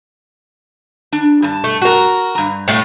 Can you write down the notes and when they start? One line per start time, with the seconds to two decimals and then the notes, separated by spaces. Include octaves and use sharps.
1.12 D4
1.42 G2 A5
1.64 A3
1.81 F#4 A#4
2.35 G2 A#5
2.68 A2 A3 F5